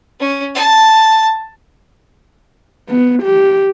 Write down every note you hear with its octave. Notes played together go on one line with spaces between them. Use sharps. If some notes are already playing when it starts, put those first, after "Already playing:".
C#4
A5
B3
G4